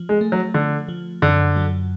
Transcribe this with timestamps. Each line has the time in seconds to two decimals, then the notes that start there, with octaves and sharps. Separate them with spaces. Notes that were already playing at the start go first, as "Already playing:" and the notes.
Already playing: F3
0.09 G#3
0.21 A3
0.32 F#3
0.54 D3 F3
0.88 F3
1.22 F#2 D3
1.56 F#3